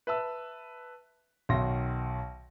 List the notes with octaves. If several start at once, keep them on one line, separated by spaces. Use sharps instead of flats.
B4 E5 A5 E6
B1 D#3 F#4 E5 C6 A#6